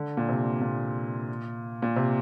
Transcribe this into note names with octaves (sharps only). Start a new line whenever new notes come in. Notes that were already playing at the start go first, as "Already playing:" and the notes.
Already playing: D3
A#2
C3
A#2
A#2
C3